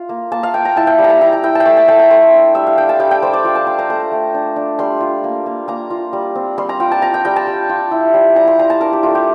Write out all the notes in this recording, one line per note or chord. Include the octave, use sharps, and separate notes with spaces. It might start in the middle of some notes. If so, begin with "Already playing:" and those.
Already playing: F4
A#3
A#3 A5
F5
A#3 G5
A#5
E4 A5
G5
G3
A#5
A5
E4 A#5
A#5
E4 G5
A5
G5
A3 A5
A5
A3 G5
A#5
A3 C6
D4
G3 E5
F5
D4 G5
A5
G3 G5
G5
G3 C5
D5
F4 F5
A5
D4 C6
A#5
A3 A#5
A3
D4
D4
G3 C6
F4
A#3
A#3
A#3 A#5
F4
G3
C4
G3 C6
A#5
F4 G5
A5
F4 A#5
G5
G3 G5
A5
G3
F4
E4
G3
G3 A#5
C6
G3 A#5
A5
D4 A#4
G4
A3 F4
G4